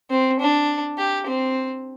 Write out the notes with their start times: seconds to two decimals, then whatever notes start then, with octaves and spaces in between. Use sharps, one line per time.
0.10 C4
0.40 D4
0.98 G4
1.27 C4